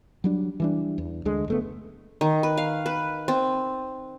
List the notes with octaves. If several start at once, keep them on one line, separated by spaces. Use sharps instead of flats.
F#3 G3 D4
E3 G3 D4
E2
D2 D3 G#3
F#1 A3 B3
D#3
B4
F5
B4
C4